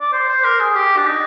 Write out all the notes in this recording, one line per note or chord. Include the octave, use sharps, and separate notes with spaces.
D5
C5
C5
A#4
G#4
G4
D4
D#4